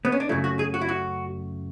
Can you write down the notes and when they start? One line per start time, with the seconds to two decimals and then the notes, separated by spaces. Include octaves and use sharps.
0.05 B3
0.12 C#4
0.20 D4
0.29 F#2 C#3 F#3 A3 E4
0.44 F#4
0.59 G#4
0.74 F#4
0.81 E4
0.89 F#4